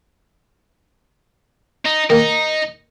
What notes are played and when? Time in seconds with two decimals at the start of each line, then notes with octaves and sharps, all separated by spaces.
1.85 D#4
2.10 D#3 A#3 D#4